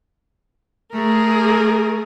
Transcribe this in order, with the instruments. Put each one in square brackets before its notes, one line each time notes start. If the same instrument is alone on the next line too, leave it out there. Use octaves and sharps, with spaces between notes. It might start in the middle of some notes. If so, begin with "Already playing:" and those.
[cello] A3 [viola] G#4 A#4